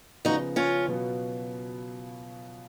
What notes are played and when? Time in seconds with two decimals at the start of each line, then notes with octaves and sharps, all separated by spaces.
0.25 C#3 F3 B3 D#4 F#4
0.56 C#4 F4
0.88 B2 F#3 B3 F4